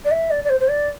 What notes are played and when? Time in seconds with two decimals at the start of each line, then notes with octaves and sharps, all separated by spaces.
0.05 D5
0.11 E5
0.30 D5
0.44 D5
0.50 C5
0.60 C5
0.68 D5